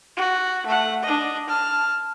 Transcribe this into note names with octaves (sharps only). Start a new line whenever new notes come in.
F#4
A3 F#5
D4 D#5
A5 F6